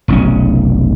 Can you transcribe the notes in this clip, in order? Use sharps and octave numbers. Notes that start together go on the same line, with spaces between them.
F1 B1 C#4